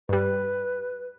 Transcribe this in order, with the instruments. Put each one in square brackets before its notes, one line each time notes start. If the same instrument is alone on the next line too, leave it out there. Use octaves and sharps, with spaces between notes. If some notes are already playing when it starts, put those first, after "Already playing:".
[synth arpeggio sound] G2 G3 [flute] B4